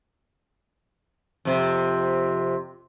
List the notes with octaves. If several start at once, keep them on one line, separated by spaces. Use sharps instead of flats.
F2 C3